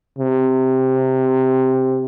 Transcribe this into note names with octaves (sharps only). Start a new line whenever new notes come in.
C3